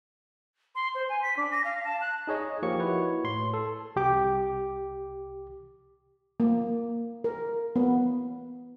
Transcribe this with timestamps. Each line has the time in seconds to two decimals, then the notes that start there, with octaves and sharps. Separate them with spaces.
0.75 C6
0.95 C5
1.09 G#5
1.22 B6
1.37 D4
1.51 A#6
1.65 F5
1.84 A5
2.01 F#6
2.27 D#4 G#4 C#5 D#5
2.63 F3 A#3 G4 C#5 C#6 C#7
2.80 E4 F#4 B4 C#5
3.24 A2 C6
3.54 A4
3.96 C2 G4 D6
6.40 A#3
7.24 A#4
7.76 B3